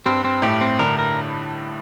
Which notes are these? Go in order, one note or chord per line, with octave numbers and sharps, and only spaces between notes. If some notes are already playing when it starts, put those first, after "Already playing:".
G2 G3 C4
C4
A2 A3 G4
C4
D3 D4 A#4
A#4